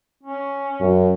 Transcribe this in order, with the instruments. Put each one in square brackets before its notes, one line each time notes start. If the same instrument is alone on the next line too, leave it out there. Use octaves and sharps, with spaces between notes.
[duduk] C#4
[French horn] F#2